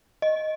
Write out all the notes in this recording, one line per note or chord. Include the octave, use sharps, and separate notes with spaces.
D#5